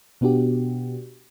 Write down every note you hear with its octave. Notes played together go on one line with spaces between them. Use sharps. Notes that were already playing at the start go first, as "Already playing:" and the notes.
B2 B3 D4 F#4 G4